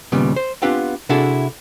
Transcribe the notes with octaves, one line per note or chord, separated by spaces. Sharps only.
D#2 A#2 C#3 G3 B3
C5
B3 C4 D4 F4 G4 B4
C3 D4 E4 F#4 G#4 A4